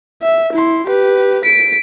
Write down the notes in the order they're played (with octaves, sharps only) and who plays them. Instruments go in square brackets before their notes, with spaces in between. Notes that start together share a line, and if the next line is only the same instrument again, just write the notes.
[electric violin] E5
E4 C6
G4 B4
B6 D7